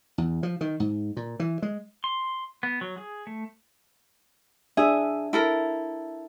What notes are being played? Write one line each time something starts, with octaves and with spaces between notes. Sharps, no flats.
E2
F3
D#3
G#2
A#2
E3
G#3
C6
B3
F#3
G#4
A3
D4 G#4 E5
E4 A4 A#4